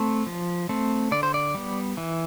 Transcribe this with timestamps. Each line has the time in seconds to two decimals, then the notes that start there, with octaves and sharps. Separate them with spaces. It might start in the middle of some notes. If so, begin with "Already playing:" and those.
Already playing: A3 C4
0.26 F3
0.69 A3 C4
1.12 D3 D5
1.23 C5
1.34 D5
1.55 G3 B3
1.97 E3